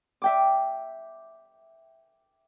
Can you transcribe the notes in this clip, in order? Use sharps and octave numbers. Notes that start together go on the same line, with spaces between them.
E5 G5 D6